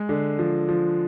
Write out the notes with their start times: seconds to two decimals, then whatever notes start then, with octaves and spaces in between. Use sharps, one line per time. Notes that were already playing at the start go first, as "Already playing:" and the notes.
Already playing: G#3
0.09 D3
0.39 F3
0.69 F3